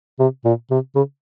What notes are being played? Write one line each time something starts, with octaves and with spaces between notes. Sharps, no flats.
C3
A#2
C3
C#3